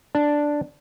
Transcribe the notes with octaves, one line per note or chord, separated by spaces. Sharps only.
D4